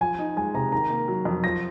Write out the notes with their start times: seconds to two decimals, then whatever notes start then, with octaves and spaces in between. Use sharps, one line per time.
0.01 F3 G#5
0.19 D#4
0.37 G#3 G#5
0.54 C3 A#5
0.72 D#3 A#5
0.90 A#3
1.08 F#3
1.25 F2
1.44 F3 A#6